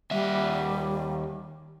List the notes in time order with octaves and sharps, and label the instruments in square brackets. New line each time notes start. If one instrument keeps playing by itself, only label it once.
[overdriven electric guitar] D#2 E5 [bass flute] G3